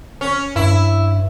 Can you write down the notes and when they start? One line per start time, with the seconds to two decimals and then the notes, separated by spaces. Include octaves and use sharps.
0.21 C#4
0.56 G2 E4